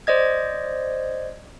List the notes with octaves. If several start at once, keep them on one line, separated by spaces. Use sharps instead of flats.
C5 D5 D#5 G#6